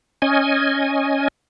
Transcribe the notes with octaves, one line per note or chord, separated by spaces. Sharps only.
C#4 D#5 G#5